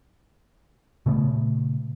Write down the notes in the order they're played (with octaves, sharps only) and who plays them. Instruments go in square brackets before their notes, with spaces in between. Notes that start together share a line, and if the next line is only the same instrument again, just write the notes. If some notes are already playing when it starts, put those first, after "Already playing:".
[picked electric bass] A#2 C#3 A3 B3